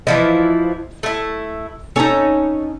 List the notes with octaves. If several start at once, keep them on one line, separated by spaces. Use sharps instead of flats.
E3 F3 E4 D#5
A3 E4
C#4 D#4 A4 C#5 A#5